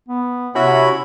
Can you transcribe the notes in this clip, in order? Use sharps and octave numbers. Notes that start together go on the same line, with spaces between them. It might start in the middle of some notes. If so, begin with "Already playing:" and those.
B3
C3 C#4 E4 F#4 B5